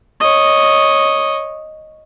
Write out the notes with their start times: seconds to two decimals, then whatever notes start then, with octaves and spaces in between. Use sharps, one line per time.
0.20 C#5 D#5